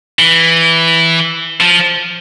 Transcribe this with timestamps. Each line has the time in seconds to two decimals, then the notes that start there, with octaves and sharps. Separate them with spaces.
0.19 E3
1.61 F3